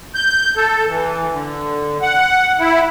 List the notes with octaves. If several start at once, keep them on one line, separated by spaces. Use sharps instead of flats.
G6
A4
E3
D3
F#5
E4